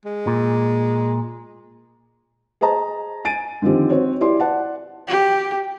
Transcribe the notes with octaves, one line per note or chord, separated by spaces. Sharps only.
G#3
A#2
G#4 C5 D#5 A5 A#5
G#5 A6 D7 D#7
D3 D#3 F3 C4 G4
C4 F#4 C5 C#5
E4 G4 D5 C6
D5 F#5 A5
G4